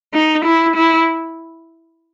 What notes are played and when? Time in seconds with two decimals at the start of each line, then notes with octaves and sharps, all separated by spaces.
0.14 D#4
0.45 E4
0.76 E4